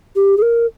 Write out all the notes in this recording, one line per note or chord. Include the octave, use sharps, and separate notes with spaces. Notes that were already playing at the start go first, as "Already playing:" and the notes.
G4
G#4
A#4